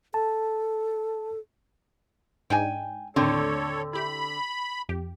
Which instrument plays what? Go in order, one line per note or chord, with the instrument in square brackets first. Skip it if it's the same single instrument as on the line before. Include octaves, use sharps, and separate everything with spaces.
[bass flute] A4 [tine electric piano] A5
[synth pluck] G#2 D4 D#4 [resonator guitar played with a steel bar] G5 G#5
[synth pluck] D#2 A2 [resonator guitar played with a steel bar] D3 C4 [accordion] A4 C#5
[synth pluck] E4 G4 [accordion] B5
[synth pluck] F2 G4